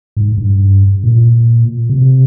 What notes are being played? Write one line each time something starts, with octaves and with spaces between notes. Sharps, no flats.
G#2
G2
A#2
C3